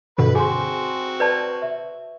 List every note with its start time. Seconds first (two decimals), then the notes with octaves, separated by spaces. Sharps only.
0.18 G2 B2 D3 B4 B5
0.35 C4 F#4 G#4 G#5 C6
1.20 B4 D5 A5 G6
1.62 E5